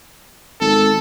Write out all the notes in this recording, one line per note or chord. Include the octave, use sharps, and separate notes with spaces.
G#1 A4